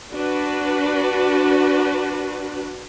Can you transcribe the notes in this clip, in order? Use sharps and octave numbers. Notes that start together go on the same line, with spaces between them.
D4 F#4 B4